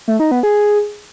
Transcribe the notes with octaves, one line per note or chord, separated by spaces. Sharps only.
A3
D#4
B3
G#4